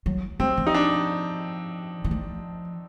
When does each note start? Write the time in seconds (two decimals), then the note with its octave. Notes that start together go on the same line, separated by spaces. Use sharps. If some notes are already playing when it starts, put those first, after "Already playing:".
0.06 F#3
0.39 F#3 C4
0.57 F3
0.67 D#4
0.75 D4
2.04 E3
2.11 F3